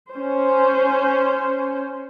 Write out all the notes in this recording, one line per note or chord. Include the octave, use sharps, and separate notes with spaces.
C#4 C5